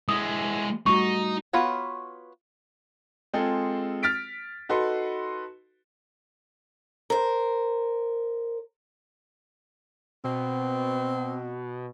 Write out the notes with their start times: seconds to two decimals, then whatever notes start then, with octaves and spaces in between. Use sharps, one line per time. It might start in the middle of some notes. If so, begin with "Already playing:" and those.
0.09 G#3 E4 D#6
0.86 G3 A3 D#4 F#4 C#6
1.53 B3 F4 F#4 C#5
3.34 G#3 C4 F4 G#4 A4
4.03 F6 A6 B6 D7
4.69 D#4 F#4 A4 B4 C6
7.10 A#4 C5
10.24 B2 C4